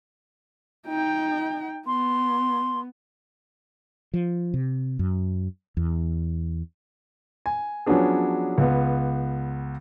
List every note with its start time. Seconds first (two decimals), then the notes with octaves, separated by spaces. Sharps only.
0.87 D#4 G5
1.87 B3 C6
4.14 F3
4.54 C3
4.99 F#2
5.77 E2
7.46 G#5
7.86 F3 F#3 B3 C#4 D4 G#4
8.58 C#2 B3